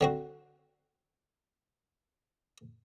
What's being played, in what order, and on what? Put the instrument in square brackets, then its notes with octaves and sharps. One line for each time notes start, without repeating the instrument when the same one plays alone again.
[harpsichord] D3 C4 F#4